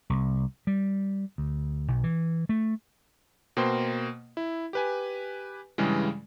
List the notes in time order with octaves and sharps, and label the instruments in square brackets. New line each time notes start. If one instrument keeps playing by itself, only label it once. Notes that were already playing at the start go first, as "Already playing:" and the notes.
[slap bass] C2
G3
D2
B1
E3
A3
[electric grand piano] B2 A#3 C5 G5 C6
E4
G4 B4 G#5
G2 C#3 E3 G3 G#3